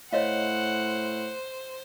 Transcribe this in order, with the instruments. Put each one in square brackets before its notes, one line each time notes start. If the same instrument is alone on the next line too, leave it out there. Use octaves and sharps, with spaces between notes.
[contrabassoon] A2 [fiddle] C5 [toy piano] C#5 D#5 F5 [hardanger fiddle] F#5